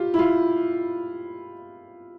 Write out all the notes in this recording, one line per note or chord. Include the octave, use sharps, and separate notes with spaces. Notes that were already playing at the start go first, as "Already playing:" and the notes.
Already playing: F4 G4
E4
F4